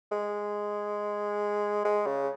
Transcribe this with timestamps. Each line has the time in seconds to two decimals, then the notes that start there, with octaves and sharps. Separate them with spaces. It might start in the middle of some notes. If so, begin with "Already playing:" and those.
0.12 G#3
1.85 G#3
2.06 C#3